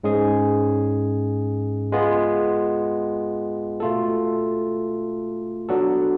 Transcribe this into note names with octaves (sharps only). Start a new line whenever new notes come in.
G#2 G#3 C#4 G#4
G#3 B3 F4
B2 A3 F4 A4
F#3 B3 D4 F#4 A4